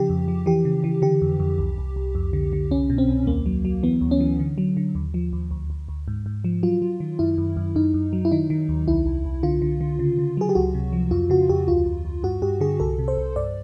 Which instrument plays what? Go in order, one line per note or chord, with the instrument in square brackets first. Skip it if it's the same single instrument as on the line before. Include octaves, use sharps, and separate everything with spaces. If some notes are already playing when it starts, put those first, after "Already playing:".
Already playing: [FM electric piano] C#3 F3 G4
F2
F3
E3 G4
C#3
E3
D3 G4
F2
F2
C2
C2
C2
F2
D3
D3
C2 C#4
B2
C4
C2
D#2 A#3
F#3
F#3
E3 B3
D2
C#4
E3
D3
F#3
D3
D#2
F3
D#2
D2
D2
D2
G#2
G#2
F3
F#3 F4
F#3
D#3
F#2 E4
F#2
F#2
F#2 D#4
F#2
F#3
E4
D#3 D#4
D#3
D#2
C2 E4
C2
C2
D3 F4
D3
D3
C#3
C#3
F#3 G#4
G4
C#2 F#4
C3
F3
F2 F4
C#3 F#4
F2 G4
D2 F4
D2
D2
G2 F#4
G2 G4
D3 G#4
C2 A4
C3
C5
C2
G2 D5